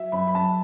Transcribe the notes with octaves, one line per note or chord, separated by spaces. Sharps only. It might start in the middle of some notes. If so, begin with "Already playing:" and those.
Already playing: F#3 E5
F#2 B5
B5
F#2 A5